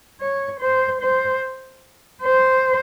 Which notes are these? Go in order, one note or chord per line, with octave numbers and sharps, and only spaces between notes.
C#5
C5
C5
C5